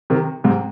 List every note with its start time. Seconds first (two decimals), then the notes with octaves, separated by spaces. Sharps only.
0.10 C3 D#3
0.44 G#2 C3